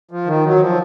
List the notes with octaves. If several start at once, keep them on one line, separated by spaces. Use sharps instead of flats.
F3
D#3
F#3
D#3
F3